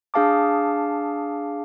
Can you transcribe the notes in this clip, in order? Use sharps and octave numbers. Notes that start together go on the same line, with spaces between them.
D4 G#4 F5 A5 D6